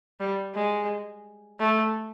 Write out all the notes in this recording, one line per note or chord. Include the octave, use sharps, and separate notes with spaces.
G3
G#3
A3